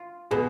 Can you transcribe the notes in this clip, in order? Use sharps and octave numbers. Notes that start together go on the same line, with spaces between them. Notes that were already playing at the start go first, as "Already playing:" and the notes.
Already playing: F4
B2 G#4